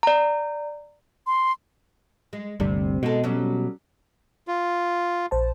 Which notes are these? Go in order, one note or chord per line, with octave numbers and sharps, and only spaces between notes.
D5 A#5
C6
G#3
G1 D2 C3 G3
B2 G#3 D#4 A4
F#3 G3 C#4
F4
A#1 C5 A5